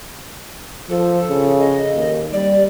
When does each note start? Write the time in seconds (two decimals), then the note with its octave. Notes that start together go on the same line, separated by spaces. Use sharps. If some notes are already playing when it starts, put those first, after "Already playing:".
0.90 F3 A4
1.29 C#3
1.59 D#5
1.95 D#2
2.33 G3 D5